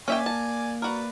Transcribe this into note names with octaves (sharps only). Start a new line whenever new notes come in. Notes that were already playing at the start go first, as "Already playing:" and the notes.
A#3 C#4 D5 E5 G5 G#5 D6
A5
F#4 A#4 B4 D5